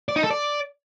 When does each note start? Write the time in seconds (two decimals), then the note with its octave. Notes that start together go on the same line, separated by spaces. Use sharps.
0.09 D5
0.16 D#4
0.23 A4
0.30 D5